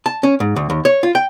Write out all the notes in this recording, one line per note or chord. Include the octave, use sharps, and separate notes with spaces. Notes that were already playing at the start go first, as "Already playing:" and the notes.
A5
C#4
G#2
D2
D#2
C#5
F4
G5